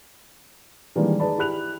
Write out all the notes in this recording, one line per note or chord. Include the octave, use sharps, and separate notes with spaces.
D#3 E3 G3 G#3 A#3 D4
D#4 G#4 B4 D5 A5 B5
E4 G4 B5 F#6 F7